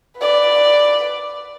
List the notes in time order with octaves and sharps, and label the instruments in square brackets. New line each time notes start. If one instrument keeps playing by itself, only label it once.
[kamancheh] B4 D5